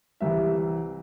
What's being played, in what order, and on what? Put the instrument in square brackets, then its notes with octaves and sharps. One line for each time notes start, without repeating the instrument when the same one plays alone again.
[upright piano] C2 C3 E3 E5